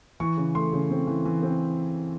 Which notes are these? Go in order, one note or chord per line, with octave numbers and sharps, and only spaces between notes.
E3 C#6
C#3
A3 C6
C#3
C4
E3
E3
C4